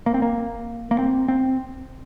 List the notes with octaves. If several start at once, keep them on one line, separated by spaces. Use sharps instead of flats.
A#3
C4
A#3
A#3
C4
C4